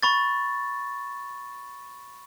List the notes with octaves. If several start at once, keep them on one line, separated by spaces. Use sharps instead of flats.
B5 C#6 A6